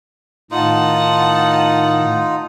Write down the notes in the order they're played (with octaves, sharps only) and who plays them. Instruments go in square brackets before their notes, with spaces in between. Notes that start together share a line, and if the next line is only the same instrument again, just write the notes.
[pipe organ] A2 D#3 [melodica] D#4 F4 [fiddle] F#5 A5